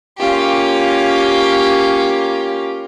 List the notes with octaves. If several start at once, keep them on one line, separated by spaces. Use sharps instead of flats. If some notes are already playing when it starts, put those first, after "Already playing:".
A#3 C#4 F4 G4